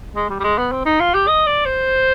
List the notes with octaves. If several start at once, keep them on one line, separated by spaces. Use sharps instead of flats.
G#3
G3
G3
G#3
B3
C4
D#4
F4
G4
D#5
D5
C5